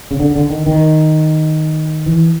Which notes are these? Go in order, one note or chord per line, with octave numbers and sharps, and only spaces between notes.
C#3
D3
D3
D#3
D#3
E3